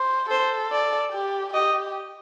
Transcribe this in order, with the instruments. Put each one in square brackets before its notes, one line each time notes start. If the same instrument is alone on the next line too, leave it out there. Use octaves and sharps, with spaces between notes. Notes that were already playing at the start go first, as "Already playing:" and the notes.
Already playing: [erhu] C5
[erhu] A4 [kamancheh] C5
[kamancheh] D5
[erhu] G4
[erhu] G4 [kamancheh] D#5